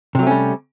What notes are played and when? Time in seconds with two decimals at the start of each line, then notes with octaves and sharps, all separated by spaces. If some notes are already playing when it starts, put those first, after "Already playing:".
0.15 C3
0.19 F#3
0.23 A3
0.27 C#4
0.31 G3